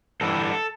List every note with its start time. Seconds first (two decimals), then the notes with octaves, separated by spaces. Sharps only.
0.21 G2 E3 G3 A4